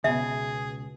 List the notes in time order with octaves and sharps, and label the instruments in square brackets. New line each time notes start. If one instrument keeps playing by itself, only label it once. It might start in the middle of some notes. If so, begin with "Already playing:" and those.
[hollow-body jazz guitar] C#2 B2 [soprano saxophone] G#4 [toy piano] E5